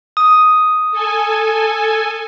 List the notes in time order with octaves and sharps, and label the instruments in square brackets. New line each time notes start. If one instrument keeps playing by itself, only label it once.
[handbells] D#6
[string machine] A4 G#5